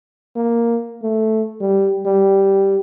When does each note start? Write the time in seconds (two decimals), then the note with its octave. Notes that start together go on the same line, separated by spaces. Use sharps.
0.36 A#3
1.02 A3
1.60 G3
2.06 G3